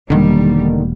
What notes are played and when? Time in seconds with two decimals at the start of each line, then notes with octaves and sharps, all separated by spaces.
0.10 E1 D3 D#3 G3 A#3